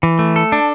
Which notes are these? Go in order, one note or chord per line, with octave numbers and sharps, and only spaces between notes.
E3
A3
A4
D4